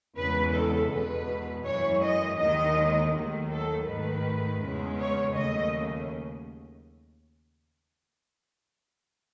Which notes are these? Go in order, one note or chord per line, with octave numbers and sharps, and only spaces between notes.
E2 C#3 E3 G#3 B4
A4
E2 B2 G#3 B4
F#2 E3 G#3 C#5
D#5
D#2 D#3 G#3 D#5
D#2 D#3 F#3 A3
A4
G#2 D#3 A3 B4
E2 C#3 G#3
C#5
D#2 C#3 F#3 A3 D#5